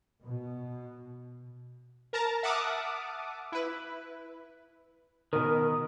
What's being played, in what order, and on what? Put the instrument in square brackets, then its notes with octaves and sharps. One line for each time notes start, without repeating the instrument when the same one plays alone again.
[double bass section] B2
[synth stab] A#4 A5 A#5
E5 F#5 A5 D6 D#6 F6
E4 B4
[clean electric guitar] B2 D#3 [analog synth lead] A#4 [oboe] D#6